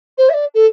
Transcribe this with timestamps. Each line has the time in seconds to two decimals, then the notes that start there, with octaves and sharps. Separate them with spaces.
0.18 C5
0.29 E5
0.33 D5
0.54 A4